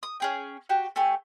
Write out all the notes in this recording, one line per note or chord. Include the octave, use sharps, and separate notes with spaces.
D#6
C#4 G#4 G5
F#4 G4 G5
A3 G4 G#5 C#6